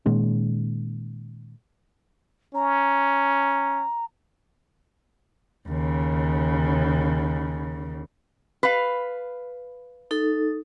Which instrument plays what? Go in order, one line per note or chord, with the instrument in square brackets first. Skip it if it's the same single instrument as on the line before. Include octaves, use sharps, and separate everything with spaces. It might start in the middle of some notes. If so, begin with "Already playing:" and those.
[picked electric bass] A#2 D#3 G#3 C#4
[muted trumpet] C#4 [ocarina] A#5
[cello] D#2 C#3
[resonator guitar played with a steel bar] B4 F5
[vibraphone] D#4 A4